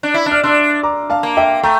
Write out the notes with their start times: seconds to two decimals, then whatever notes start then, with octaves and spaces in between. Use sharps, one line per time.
0.03 D4
0.14 E4
0.26 D4
0.31 F6
0.43 D4 C6 E6
0.83 A#5 D6
1.10 F5 A5
1.23 A#3
1.37 E5 G5
1.63 A3 G5 A#5